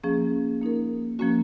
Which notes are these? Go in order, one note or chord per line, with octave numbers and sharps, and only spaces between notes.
F3 A#3 C#4 G#4
A#3 D#4 A#4
F3 A#3 C#4 F#4